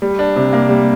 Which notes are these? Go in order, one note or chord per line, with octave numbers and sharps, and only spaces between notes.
G3
D4
C3
A#3
G3